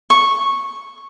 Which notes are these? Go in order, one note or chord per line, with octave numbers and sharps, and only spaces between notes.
C#6